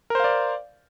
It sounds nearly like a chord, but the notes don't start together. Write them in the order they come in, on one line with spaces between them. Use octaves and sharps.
A#4 C5 F5 D5